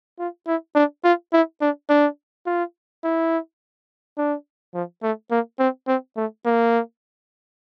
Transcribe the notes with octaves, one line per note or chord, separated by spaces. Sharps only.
F4
E4
D4
F4
E4
D4
D4
F4
E4
D4
F3
A3
A#3
C4
C4
A3
A#3